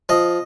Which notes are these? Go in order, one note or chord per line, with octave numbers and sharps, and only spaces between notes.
F3 D#5